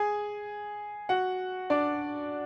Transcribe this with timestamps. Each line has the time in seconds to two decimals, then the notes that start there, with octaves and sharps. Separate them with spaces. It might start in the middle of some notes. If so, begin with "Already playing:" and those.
Already playing: G#4 G#5
1.09 F#4 F#5
1.70 D4 D5